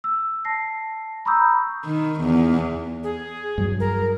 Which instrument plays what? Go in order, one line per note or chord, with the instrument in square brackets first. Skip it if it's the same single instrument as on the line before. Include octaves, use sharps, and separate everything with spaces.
[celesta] E6
A5 A#6 C7
A#5 B5 C#6 D#6 E6 G6
[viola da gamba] D#3
E2
[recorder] G#4
[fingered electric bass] G2 F#3
[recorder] A#4